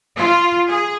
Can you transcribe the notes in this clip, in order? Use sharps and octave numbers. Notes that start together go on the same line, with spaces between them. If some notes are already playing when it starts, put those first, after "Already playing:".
F4
G#4